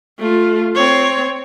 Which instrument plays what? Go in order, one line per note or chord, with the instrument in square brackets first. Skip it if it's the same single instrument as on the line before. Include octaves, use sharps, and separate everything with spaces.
[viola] A3 F4
C4 C#5